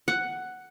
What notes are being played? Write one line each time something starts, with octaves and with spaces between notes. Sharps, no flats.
F#5